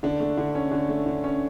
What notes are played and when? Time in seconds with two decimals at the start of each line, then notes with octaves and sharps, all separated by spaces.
0.03 D3 D4
0.20 A3
0.38 D3
0.55 C#4
0.72 D3
0.89 A3
1.06 D3
1.24 C#4